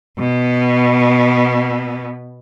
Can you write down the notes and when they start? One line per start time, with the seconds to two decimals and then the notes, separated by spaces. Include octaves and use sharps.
0.19 B2 B3